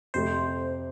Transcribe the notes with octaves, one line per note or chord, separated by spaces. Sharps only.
F2 C3 A3 C5